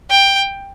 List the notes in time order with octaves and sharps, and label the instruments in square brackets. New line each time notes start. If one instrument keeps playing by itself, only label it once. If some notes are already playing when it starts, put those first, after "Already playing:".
[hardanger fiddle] G5